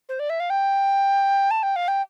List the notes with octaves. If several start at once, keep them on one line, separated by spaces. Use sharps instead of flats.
C5
D5
E5
F5
G5
A5
G5
F5
G5